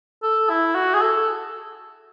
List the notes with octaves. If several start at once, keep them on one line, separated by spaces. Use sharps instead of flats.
A4
E4
F#4
G#4
A4